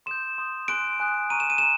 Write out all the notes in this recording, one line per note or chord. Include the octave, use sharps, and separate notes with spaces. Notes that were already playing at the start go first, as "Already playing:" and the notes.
C6 D#6 G6 E7
C6 D#6 G6
G#5 C6 D#6 F#6 D7
G#5 C6 D#6 F#6
A#5 C#6 F6 D#7
E7
D#7
A#5 E7